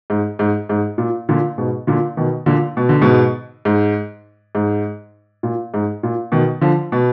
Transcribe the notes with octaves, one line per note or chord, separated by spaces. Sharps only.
G#2
G#2
G#2
A#2
A#2 D3
G#2 B2
A#2 D3
B2 D#3
A#2 D3
B2
D3
G#2 B2
G#2
G#2
A#2
G#2
A#2
B2 D#3
D3 F3
B2